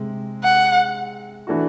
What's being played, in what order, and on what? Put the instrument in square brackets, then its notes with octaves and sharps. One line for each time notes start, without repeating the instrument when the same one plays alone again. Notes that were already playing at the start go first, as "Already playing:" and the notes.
Already playing: [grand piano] C3 G#3
[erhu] F#5
[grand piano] E3 A3 D4 F#4